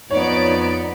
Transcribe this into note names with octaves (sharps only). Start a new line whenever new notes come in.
F2 B3 D#4 C#5 D5 D7